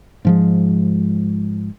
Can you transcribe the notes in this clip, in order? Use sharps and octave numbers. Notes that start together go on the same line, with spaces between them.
G#2 F3 G#3